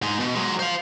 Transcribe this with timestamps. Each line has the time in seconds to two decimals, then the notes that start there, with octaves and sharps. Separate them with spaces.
0.02 G#2 G#3
0.20 B2
0.35 F#3 G#3
0.59 C5 F5